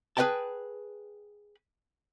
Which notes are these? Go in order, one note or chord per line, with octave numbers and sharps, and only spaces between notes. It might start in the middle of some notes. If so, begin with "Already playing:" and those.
G#4 B4 C5 D#5 G5 A5